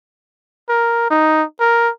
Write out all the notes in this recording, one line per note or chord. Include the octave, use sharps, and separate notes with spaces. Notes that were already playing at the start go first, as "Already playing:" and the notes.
A#4
D#4
A#4